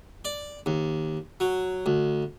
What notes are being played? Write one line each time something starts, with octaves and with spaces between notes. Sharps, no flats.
D5
D#2
F#3
D2